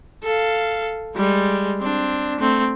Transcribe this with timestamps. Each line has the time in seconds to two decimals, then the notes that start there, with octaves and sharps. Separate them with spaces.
0.23 A4 F5
1.16 G3 G#3
1.80 C4 D4
2.40 A3 C4